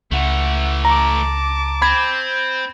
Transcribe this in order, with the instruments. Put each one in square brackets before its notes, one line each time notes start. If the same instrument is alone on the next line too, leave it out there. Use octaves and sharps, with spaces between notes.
[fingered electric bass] C#2 [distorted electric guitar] E3 A3 [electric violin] F#5
[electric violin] A5 D6 [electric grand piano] A#5
[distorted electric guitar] C4 [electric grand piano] B5 G#6